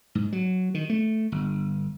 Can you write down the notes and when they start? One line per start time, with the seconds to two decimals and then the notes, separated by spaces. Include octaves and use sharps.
0.15 G#2
0.32 F#3
0.74 D#3
0.90 A3
1.32 G1